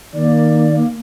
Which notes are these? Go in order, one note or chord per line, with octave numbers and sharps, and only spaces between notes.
D#3 A#3 D5